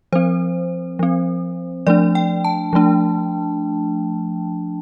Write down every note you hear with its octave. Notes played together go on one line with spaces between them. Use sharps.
F3 C4 C5
F3 C4
F3 A3 D4 D5
G5
A5
F3 A3 D4